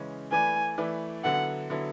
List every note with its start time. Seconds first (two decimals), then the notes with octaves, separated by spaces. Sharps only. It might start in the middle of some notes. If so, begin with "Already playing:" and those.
Already playing: C#3 E3 G#3 C#4
0.32 E3 A3 E4 B4 D5 G#5
0.78 E3 A3 E4 B4 D5
1.24 D3 F#3 B3 E4 A4 F#5
1.70 D3 F#3 B3 E4 A4